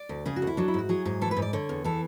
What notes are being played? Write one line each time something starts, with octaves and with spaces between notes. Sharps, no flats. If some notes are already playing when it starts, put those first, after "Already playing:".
Already playing: D5
D2
C#3 G#4
F#4
D2
E4
F#3 D4
E4
G#2 F#4
F#3 G#4
G#2 G#4
E3 A4
B4
G#2
D5
D3 C#5
E2
E3 A4